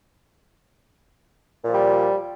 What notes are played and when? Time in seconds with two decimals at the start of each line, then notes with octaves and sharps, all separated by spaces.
1.64 A#2
1.68 F3
1.72 G3